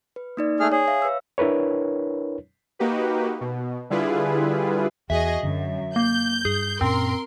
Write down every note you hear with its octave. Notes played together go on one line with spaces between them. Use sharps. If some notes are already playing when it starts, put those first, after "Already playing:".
B4
A#3 D#4 D5
A3 G#4 F6
G#4 C#5
E5 F5
B4 C#5 E6
D4 E4 A#4 B4 C#5
A#3 D#4 F#4 G4 B4
B2
D3 G3 E4 F4 G#4 B4
E2 F#4 G#4 D#5 E5
F#2 D3
A#3 G6
G2 G#4
F#2 A#2 C4 C#4 A#4 C6